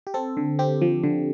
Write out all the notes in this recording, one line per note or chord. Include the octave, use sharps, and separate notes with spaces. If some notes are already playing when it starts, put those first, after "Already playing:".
G4
C4 A4
D3
C4 G4
F3
D3